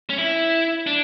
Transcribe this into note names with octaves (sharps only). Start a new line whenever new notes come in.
C#4
E4
D4